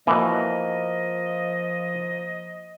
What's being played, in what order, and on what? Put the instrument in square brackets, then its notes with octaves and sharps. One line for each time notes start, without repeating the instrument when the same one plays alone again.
[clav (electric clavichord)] B2 E3 [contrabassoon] F3 [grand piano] A#3 [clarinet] D#5